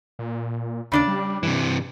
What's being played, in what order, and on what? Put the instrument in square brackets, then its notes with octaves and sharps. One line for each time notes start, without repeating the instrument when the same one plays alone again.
[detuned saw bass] A#2
[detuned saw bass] D#2 [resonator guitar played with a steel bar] C#3 D4 D5
[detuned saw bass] G3
[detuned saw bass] G2 [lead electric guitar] C3 E3